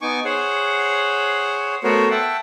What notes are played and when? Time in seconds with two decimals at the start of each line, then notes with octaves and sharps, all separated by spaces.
0.02 B3 D#4 G#5 C#6 D6
0.24 G#4 C5 C#5 F#5
1.84 A3 B3 F#4 A#4 C5 C#5
2.11 E5 F#5 G5 A5